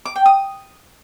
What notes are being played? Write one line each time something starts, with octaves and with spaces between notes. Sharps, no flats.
D6
G5
D#6